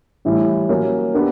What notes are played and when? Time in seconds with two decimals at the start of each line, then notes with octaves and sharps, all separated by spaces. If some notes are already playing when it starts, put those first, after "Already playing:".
0.25 A2 E3 G3
0.69 F#3 A#3 C#4
1.14 B3 D4 G4 A#4